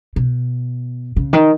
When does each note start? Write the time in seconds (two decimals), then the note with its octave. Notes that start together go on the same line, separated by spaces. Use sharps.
0.16 B2
1.16 C#3
1.33 D#3